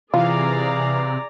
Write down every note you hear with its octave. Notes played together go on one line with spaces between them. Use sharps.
C3 E3 F4 G#4 D5 F5 A#5